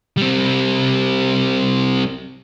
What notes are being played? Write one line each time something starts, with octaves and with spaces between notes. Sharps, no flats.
G3 C4